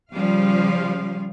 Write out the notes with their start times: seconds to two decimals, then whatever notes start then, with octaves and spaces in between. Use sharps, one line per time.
0.12 C#3 F3 G3 F4 F5